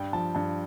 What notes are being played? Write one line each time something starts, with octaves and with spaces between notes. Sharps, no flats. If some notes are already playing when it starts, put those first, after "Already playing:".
Already playing: G2 G5
F3 A5
G2 A5